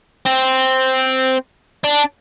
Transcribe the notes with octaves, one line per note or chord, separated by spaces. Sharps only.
C4
D4